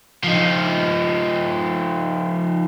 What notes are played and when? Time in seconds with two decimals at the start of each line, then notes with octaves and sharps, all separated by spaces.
0.24 F3 D#4